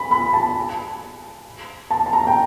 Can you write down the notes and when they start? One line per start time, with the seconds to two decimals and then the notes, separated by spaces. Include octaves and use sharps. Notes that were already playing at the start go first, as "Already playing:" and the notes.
Already playing: B5
0.11 B5
0.33 A5
1.91 A5
2.06 A5
2.13 A#5
2.27 G5